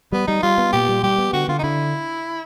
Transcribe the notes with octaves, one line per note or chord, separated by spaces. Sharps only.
G3 B3
G3 D#4
G3 F4
B3
A#2 G4
G3
G3 G4
B3
D3 F#4
D3 F4
D#4
D3 E4